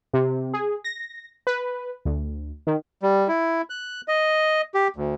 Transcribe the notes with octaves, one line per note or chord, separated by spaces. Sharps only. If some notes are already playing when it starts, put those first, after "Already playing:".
C3
G#4
A#6
B4
D2
D#3
G3
E4
F#6
D#5
G4
D2